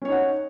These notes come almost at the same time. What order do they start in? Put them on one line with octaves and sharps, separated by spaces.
C#4 C#5 D#4 F#5